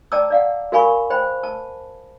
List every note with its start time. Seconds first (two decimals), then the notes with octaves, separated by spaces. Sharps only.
0.12 D5 G5 A5 A#5 D6 E6
0.30 D5 F5 F#5
0.72 F#4 A#4 F5 G#5 B5 C#6
1.10 C5 G5 B5
1.43 A5